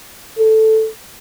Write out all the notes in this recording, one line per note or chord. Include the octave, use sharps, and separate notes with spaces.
A4